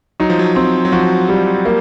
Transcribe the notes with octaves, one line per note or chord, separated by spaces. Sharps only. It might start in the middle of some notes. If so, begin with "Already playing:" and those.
F#3 D#4
F3
F#3
C4
F#3
F3 F#4
G3
A#3